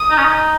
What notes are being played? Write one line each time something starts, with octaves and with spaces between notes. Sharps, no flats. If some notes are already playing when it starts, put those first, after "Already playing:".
Already playing: D#6
D#4
C#4
D#4